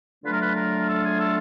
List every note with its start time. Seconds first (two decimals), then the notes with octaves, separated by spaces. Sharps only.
0.23 D3 F#3 A3 D4 F4 B4
0.31 A#4
0.38 B4
0.55 A#4
0.86 A4
1.03 G#4
1.18 A4